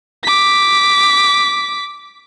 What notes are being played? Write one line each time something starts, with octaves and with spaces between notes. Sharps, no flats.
D6 B6